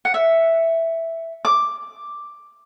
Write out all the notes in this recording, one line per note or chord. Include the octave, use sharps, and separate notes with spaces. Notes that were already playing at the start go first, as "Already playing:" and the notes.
F#5
E5
D6